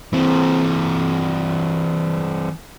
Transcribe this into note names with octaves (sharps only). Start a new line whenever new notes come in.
E3 C4